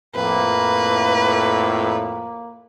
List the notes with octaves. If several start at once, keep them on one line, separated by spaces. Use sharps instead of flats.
F2 A2 A#3 B4